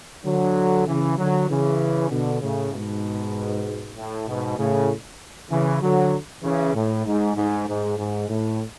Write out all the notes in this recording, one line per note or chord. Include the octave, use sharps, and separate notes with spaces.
D3 F#3
C#3 E3
D3 F#3
C#3 E3
B2 D3
A2 C#3
G#2 B2
A2
G#2 B2
A2 C#3
C#3 E3
D3 F#3
C#3 E3
A2
G#2
G#2
G#2
G#2
A2